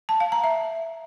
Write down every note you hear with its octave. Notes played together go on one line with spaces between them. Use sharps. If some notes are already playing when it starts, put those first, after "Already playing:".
A5
F5
A#5
E5